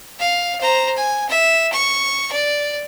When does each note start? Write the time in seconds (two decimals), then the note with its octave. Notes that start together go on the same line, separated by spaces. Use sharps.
0.19 F5
0.60 C5 A#5
0.97 G#5
1.29 E5
1.72 C#6
2.32 D5